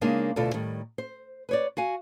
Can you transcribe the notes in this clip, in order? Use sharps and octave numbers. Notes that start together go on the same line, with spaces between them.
C#3 G#3 A#3 D4 D#4
D2 B2 E4 F4 A4 D5
A2 D#3 G3
C5
B4 C#5 D5
F#4 F5 G#5